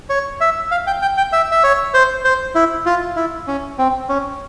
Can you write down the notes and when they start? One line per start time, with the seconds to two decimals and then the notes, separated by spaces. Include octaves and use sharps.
0.10 C#5
0.41 E5
0.71 F5
0.87 G5
1.02 G5
1.17 G5
1.33 E5
1.51 E5
1.63 C#5
1.94 C5
2.24 C5
2.55 E4
2.86 F4
3.16 E4
3.47 C#4
3.78 C4
4.09 C#4